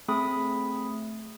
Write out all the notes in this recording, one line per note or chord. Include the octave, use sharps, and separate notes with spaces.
A3 C4 G#4 B5 D#6